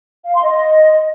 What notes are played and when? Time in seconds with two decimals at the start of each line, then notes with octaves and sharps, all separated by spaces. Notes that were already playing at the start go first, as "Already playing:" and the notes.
0.25 F5
0.34 C6
0.43 D#5